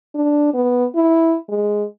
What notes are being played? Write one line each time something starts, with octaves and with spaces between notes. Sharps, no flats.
D4
B3
E4
G#3